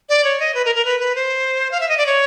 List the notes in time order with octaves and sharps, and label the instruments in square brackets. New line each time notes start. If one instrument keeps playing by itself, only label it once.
[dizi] D5
C#5
D#5
B4
A#4
A#4
B4
B4
C5
F5
E5
D#5
D5
C#5